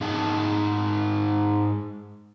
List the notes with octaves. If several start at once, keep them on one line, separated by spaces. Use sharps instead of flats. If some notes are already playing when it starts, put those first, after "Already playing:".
G#2 D#4 G#4 F#5 A5